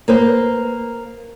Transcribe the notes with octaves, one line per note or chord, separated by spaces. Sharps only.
A#3 B4 C5